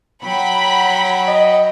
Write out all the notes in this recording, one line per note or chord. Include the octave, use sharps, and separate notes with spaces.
F#3 F#5 G5 B5
D#5